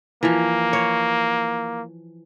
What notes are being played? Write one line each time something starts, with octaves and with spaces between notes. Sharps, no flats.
E3 F3 A#3
C#5